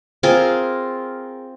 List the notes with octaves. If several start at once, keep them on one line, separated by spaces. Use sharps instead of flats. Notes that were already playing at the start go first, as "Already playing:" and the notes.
C4 F4 G#4 A#4